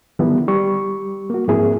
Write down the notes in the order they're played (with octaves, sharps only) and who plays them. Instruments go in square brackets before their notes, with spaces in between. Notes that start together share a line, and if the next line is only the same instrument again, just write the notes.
[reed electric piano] D3 D#3 F3 G3 B3 E4
G3 C#6
A#3 F#4
G#2 F3 A#3 C4 E4 G#4